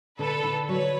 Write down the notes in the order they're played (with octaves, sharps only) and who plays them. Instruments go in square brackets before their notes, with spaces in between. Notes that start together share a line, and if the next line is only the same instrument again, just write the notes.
[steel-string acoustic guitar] D3 [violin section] A4 B4
[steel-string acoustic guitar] D3
[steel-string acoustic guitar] F#3 [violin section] B4 C#5